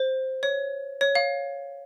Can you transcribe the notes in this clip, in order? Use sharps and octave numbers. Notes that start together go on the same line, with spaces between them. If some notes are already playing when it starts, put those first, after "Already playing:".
Already playing: C5
C#5
C#5
F5